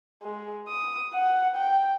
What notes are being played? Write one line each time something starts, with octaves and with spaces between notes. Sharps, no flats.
G#3
D#6
F#5
G5